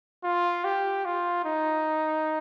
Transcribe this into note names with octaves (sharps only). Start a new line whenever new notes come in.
F4
G4
F4
D#4